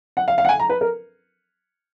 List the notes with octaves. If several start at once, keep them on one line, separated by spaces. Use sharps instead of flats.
F#5
F5
F5
F#5
G#5
A#5
B4
A#4